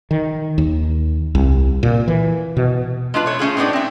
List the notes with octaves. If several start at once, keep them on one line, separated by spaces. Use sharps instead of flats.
D#3
D#2
C2
A#2
E3
B2
G#3 D4 F4 B4
A3 C#5
A3 C#4 F4 G#4
A2 G#3 B3 D4 D#4
C4 E5